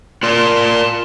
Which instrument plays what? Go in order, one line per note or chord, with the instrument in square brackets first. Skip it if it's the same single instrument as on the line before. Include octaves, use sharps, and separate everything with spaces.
[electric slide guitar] F4 A#4 D5 [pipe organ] A5 C6